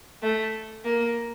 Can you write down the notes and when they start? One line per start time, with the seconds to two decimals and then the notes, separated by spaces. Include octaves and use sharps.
0.23 A3
0.85 A#3